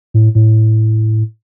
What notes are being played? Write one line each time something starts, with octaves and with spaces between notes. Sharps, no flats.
A2
A2